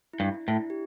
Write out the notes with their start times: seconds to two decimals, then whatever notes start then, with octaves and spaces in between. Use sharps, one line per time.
0.13 E4
0.20 G2
0.34 D4
0.48 A2 E4
0.55 D4
0.70 G4